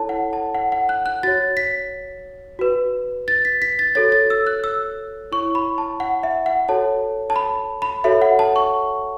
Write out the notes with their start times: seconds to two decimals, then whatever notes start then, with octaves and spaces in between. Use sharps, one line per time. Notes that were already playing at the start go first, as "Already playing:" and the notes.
Already playing: E4 A4 C#5 A5
0.09 F#5
0.33 A5
0.55 F#5
0.72 F#5
0.89 F#6
1.06 F#6
1.23 F#4 C#5 A6
1.57 B6
2.59 F#4 B4
3.28 A6
3.45 B6
3.62 B6
3.79 A6
3.95 F#4 A4 C#5 A6
4.12 A6
4.30 E6
4.47 F#6
4.64 E6
5.32 E4 C#5 C#6
5.55 B5
5.78 A5
6.00 F#5
6.23 E5
6.46 F#5
6.69 F#4 A4 C#5 A5
7.30 A5
7.36 B5
7.82 B5
8.04 F#4 A4 C#5 E5
8.22 F#5
8.39 A5
8.56 C#6